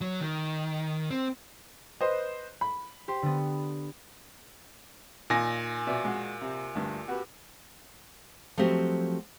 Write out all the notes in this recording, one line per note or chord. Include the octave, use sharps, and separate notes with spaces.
F#3
D#3
C4
B4 C5 D#5
B5
G4 C5 C6
D3 B3
A#2 D#3 D#4 G#5 A#6
B2 D5 E5
G#3 F#4
C3
D2 G2
F#4 G4 B4
F3 F#3 A3 C4 F#4 G4